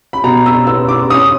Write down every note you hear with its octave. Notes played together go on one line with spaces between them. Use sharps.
B5
B2 A#5
E6
B3 E6
D6
C#4 D#6